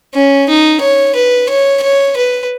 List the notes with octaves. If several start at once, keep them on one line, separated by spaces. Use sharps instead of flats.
C#4
D#4
C#5
B4
C#5
C#5
B4